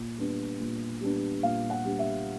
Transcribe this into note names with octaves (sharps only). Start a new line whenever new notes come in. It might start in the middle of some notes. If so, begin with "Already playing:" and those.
Already playing: A#2
G3 B3 D4
A#2
G3 B3 D4
A#2 F5
F#5
G3 B3 D4
E5